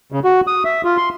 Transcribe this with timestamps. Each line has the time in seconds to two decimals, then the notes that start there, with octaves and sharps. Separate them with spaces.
0.12 C#3
0.24 F#4
0.47 D#6
0.65 E5
0.85 F4
0.97 C6